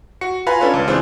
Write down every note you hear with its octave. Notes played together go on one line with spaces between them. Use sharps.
F#4 C#7
F4 B4 F5 G#5 A#5 B5
C#4 D4 F4 A4 B4 C#5
C#2
E3 C4 D4 F4 G#4 C5